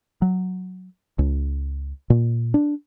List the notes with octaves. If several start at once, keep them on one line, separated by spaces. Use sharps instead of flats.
F#3
C#2
A#2
D4